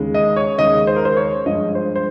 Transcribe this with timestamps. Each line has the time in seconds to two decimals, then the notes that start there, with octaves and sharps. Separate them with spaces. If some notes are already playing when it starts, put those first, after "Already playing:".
Already playing: D#2 C#3 G#3
0.14 D#5
0.36 C#5
0.58 D#2 C#3 G#3 D#5
0.87 C5
0.96 A#4
1.05 C5
1.17 C#5
1.46 G2 F3 G#3 D#5
1.75 C5
1.96 C5